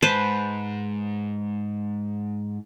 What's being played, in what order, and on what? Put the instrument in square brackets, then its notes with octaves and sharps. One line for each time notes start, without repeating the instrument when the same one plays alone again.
[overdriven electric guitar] G#2 [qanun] B4 C5 A5